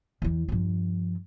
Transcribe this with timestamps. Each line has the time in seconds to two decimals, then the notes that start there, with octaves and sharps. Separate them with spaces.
0.22 E2 E3
0.48 G2 F3